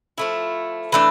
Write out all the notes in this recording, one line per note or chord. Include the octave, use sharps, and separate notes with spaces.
F3 A3 E4
E3 A3 D4